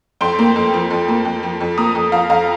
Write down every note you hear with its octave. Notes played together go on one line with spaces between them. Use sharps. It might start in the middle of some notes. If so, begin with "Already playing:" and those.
F2 G5 C6
A#3
F2
F3
F2
A#3
F2
F3
F2
A#3 A#5 D#6
F2
F3 F5 A#5
F2 F5 A#5